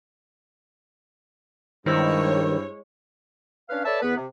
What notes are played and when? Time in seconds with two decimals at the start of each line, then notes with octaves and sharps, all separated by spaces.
1.86 G2 D#3 G#3 E4 C5 C#5 E6
3.69 C#4 D4 B4 C#5 F5
3.85 A4 B4 C#5 D5 E5 A5
4.02 E2 B3 B4
4.17 C3